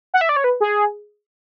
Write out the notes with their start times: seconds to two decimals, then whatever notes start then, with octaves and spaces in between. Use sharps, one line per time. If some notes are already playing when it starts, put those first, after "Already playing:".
0.14 F#5
0.21 E5
0.29 D5
0.36 C#5
0.44 B4
0.61 G#4